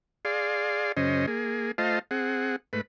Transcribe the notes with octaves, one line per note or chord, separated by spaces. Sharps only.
G#4 D5 F5 C6
F#2 C#3 C#4 C5 D#5
A#3 G#4
A3 F4 C5 D#5 F5 A5
C4 G#4 F#5
G#2 A3 B4